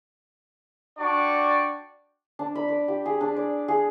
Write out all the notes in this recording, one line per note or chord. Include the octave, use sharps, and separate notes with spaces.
D4 F#4 D5 G5 C#6
D4
B5
D6
G4
G#4
D4
D5
G#4